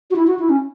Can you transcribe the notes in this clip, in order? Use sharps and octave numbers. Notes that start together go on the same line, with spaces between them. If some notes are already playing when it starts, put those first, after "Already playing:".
F#4
E4
F#4
E4
C#4